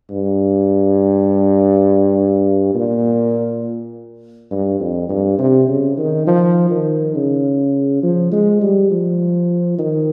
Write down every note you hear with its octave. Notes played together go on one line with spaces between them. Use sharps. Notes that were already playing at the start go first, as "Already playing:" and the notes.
G2
A#2
G2
F2
G2
C3
C#3
D#3
F3
D#3
C#3
F3
G#3
G3
F3
D#3